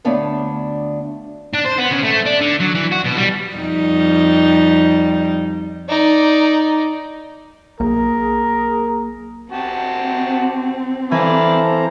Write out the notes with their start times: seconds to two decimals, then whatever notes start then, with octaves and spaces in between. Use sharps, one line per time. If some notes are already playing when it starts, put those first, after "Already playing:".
0.05 D2 B3 D4 C#5 D5 F5
1.54 D4
1.66 C5
1.79 B3
1.93 C#3
2.05 A3
2.26 D4
2.41 D3
2.60 F#3
2.75 E3
2.91 F#4
3.04 B2
3.17 G3
3.55 F2 G3 D#4
5.89 D#4 D5
7.80 B1 A#3 G#4 A#4
9.52 C4 F#4 G4 A5
11.11 E3 A4 C5 D5 F5 A5 A#5